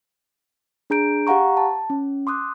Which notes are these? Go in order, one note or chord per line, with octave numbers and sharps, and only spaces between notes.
D4 G#4 A#5 G6 D7
G4 F5 F#5 A#5 C#6
A5
C#4
C6 D6 D#6 F#6